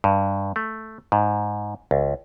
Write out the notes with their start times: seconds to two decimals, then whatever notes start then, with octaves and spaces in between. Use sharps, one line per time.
0.04 G2
0.56 A3
1.12 G#2
1.91 C#2